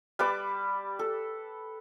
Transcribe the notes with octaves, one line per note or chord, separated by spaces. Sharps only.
G3 B4 A5 D6
A4